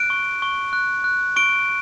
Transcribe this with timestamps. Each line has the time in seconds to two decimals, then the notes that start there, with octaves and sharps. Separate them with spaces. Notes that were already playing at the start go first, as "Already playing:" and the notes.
Already playing: F#6 D7
0.10 C#6
0.42 C#6
0.73 F#6
1.04 F#6
1.36 C#6 D7